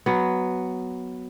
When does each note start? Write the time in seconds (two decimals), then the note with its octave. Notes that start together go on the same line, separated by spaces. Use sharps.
0.06 F#3 B3